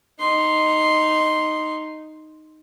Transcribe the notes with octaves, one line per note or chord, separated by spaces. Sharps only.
D#4 C6